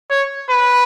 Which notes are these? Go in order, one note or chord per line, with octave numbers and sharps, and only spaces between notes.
C#5
B4